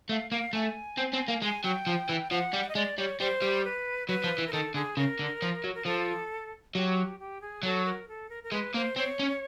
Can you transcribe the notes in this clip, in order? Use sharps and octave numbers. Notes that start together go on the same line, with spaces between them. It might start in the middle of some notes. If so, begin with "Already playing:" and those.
A3 F5
A#3 F5
A3 G#5
C4
C4
A#3
G#3 G#5
F#3 G5
F3
E3
F3 F#5
G3
D#5
G#3 D5
G3 C#5
G3 C5
G3
B4
F#3 B4
F3
E3
A#4
D#3 A4
D3 G#4
C#3 A#4
D3
F3
F#3
A#4
F3 A4
F#3 G4
G4
G#4
F#3 A4
A#4
A4
A#4
A#4
G#3 B4
A#3 C5
C4 C#5
C#4